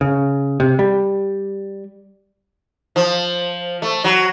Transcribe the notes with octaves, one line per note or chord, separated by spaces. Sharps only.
C#3
C3
G3
F3
A3
F#3